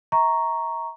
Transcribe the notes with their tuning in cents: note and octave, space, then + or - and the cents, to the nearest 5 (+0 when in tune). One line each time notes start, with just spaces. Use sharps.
E5 -35 A#5 +0 C#6 +0